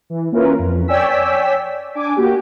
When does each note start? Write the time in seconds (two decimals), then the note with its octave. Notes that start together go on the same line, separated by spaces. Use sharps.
0.10 E3
0.32 A#3 C#4 E4 F4 A#4 B4
0.59 F2
0.88 C#5 D5 G5 G#5 E6 B6
1.95 D4 G#5 D6
2.16 A#3 F#4 G4